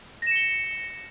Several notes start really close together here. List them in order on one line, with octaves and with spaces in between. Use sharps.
A#6 E7 C#7 G7